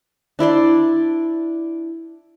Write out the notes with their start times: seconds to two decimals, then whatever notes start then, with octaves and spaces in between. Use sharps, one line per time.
0.39 D4 E4 D5 C6